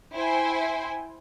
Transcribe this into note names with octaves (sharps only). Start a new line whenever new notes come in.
E4 C5 G5 G#5 C6